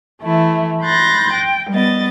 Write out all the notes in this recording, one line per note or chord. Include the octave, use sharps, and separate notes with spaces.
E3 A3 E4
B5 C6 F#6 G6 A6 A#6
G5
G3 B3 D#5 A6